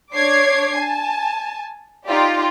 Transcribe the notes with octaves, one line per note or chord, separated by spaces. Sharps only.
D4 C#5 D6 G#6 C7
G#5 A5
D#4 F4 G4 D5